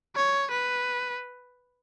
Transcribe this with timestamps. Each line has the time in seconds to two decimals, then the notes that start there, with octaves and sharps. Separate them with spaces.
0.16 C#5
0.51 B4